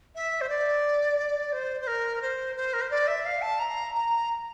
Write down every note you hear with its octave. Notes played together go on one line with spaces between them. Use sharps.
E5
C5
D5
C5
C5
A#4
C5
C5
A#4
C5
D5
E5
F5
A5
A#5
A#5